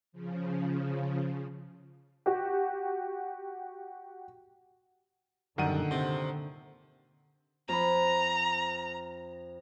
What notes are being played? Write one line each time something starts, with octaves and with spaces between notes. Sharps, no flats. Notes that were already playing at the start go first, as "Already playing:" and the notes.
C#3 F3
F#4 G4
F#2 A#2 D3 D#3 G3 F#5 D#7
C3 C4
F2 A#5 B5